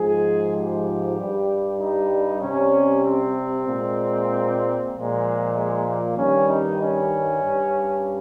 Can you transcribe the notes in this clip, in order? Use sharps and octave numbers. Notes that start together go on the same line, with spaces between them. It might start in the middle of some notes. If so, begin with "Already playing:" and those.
Already playing: G#2 F3 G#3 G#4
G4
G2 G3
D#4
C3 G3 C#4
C4
A#2 G#3
A#2 F3 G#3
G#3
A#3
G2 D#3 G3 C#4
D#4
C#4
G2 G3